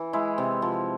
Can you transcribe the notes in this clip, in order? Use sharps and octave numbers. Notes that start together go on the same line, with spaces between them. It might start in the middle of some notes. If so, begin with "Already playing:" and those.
Already playing: E3
G#3 E4
C3
F3